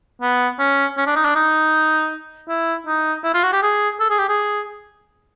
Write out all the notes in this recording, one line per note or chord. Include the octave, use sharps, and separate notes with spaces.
B3
C#4
C#4
D4
D#4
D4
D#4
E4
D#4
E4
F4
F#4
G4
G#4
A4
G#4
G4
G#4